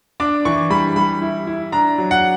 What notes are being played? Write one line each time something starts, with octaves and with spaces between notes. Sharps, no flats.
D4 D6
E3 C#6
G3 B5
G3 B5
E4
E4
D4 A#5
F#3
F#5